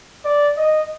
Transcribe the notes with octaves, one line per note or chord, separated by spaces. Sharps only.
D5
D#5